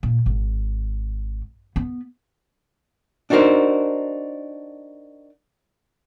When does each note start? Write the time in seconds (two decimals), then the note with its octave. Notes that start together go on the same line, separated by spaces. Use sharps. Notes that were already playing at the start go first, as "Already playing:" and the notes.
0.03 A#2
0.26 G#1
1.76 B3
3.30 D4 D#4 F#4 A#4 C5